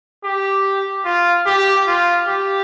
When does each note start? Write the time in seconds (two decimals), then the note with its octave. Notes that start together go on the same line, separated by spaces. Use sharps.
0.24 G4
1.05 F4
1.46 G4
1.87 F4
2.28 G4